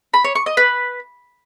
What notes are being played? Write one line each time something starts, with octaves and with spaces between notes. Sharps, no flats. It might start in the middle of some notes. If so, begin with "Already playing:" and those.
B5
C#5
C#6
D#5
B4